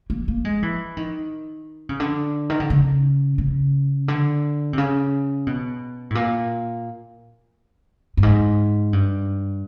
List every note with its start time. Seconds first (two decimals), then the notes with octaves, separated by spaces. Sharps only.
0.10 A#3
0.28 A#3
0.45 G#3
0.62 E3
0.97 D#3
1.89 C#3
2.00 D3
2.50 D#3
2.60 D3
2.70 C#3
3.38 C#3
4.08 D3
4.73 C3
4.78 C#3
5.47 B2
6.10 A2
6.15 A#2
8.17 G2
8.23 G#2
8.93 G2